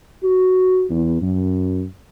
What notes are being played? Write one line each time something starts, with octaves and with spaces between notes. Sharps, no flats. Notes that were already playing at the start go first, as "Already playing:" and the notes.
F#4
E2
F#2